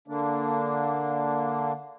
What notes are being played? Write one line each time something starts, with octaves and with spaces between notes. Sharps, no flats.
D3 A#3 D4